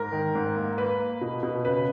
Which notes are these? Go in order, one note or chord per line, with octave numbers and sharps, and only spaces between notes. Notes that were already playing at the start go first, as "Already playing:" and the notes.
Already playing: G#2 A#4
D#3
G#2
A#3
A#3 B4
A#3
B2
B2
C#3 B4